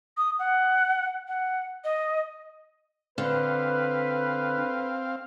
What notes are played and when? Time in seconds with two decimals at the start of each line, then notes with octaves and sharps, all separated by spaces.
0.17 D#6
0.39 F#5
1.28 F#5
1.84 D#5
3.18 D3 C4 B4 F5